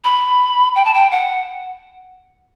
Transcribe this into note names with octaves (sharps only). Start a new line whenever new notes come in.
B5
G5
A5
G5
F#5